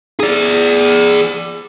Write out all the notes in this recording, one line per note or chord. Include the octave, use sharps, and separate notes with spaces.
G#4 D5